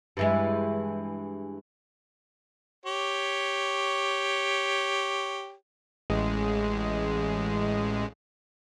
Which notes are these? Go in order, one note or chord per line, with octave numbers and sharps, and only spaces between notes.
G2 E3 G#3
G4 C#5
A1 G#3